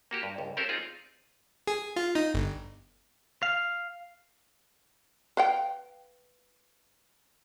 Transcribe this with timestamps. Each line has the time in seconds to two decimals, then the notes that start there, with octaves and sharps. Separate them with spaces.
0.11 A#3 F#4 G4
0.23 G2
0.38 C#2 G2
0.57 C4 C#4 G4 A4 A#4 C5
0.69 C4 D#4 F4 G#4
1.67 G#4
1.96 F4
2.15 D#4
2.34 G1
3.43 F5
5.37 B4 F5 G5